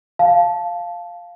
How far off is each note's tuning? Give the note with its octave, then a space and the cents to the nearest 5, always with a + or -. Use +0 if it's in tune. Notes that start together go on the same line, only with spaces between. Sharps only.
F5 +0 A5 -10